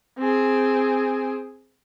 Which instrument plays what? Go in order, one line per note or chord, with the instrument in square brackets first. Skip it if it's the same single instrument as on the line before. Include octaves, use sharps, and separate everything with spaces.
[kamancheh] C4 G#4